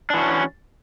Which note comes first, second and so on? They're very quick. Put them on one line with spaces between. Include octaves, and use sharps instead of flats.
D4 E3 F#4 C#4